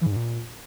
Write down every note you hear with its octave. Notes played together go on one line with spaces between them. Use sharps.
E3
G#2
G2
A#2